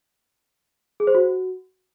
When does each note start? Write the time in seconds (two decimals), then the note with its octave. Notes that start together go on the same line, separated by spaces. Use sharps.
1.00 G#4
1.07 C5
1.15 F#4